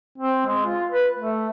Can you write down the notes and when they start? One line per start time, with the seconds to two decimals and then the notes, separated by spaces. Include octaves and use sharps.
0.18 C4
0.46 G#3
0.66 F4
0.91 B4
1.19 A3